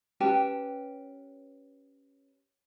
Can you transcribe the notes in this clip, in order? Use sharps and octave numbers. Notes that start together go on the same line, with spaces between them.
C#4 G4 B4 A5